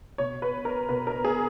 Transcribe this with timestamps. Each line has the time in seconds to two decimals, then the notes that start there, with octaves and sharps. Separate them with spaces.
0.18 B2 C#5
0.42 B4
0.65 A#4
0.89 B2 B4
1.07 A#4
1.25 G#4